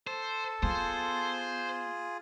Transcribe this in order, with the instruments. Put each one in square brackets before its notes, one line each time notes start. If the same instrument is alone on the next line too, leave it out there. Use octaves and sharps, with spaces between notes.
[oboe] A4 [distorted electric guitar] C5
[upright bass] B3 [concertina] F4 G#4 [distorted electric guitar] C5